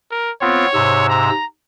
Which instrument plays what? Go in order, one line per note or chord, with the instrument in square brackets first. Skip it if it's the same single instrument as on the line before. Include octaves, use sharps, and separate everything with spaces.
[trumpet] A#4
[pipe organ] B3 C4 F4 [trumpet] C#5
[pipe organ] G#2 C3 E6
[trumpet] A#5